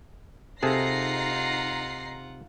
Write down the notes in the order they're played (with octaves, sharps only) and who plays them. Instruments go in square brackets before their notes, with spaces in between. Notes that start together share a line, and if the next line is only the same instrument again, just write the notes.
[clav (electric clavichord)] C3 G#4 A4 [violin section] D#4 A#6 C7 [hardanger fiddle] F4 F#5